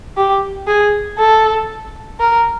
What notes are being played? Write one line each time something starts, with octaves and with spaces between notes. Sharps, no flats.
G4
G#4
A4
A#4